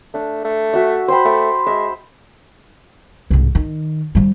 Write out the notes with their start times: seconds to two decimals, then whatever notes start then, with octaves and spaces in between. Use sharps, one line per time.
0.14 A3 D4
0.45 A3
0.74 F#4 E5
1.08 C5 G5 B5
1.25 A3 D6
1.66 G#3 E5
3.30 C2 G#2
3.55 D#3
4.15 F3 G3